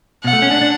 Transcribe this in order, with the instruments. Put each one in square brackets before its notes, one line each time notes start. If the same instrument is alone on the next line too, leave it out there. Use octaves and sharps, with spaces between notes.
[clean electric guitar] B2 [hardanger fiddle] F#5
[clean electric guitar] A3
C#4
D4
D4